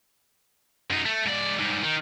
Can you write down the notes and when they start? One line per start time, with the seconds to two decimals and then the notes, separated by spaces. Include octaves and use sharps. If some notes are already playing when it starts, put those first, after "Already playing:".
0.90 F#2 D#4
1.06 A3
1.26 G#2 D5
1.60 G#2 G3
1.83 D#3